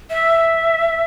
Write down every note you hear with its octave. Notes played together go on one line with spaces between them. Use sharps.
E5